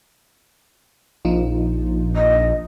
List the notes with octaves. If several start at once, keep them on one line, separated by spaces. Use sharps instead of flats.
A#1 F3 D#4 F4
D#5